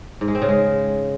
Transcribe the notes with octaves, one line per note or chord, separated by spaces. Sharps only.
G#2
G#3
C4
C#3
G#3